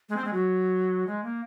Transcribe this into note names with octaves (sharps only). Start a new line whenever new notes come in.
G#3
C4
G#3
F#3
G#3
A#3